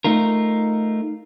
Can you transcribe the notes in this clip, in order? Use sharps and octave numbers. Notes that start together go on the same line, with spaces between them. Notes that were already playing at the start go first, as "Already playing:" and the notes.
A3 D#4 F4 A#4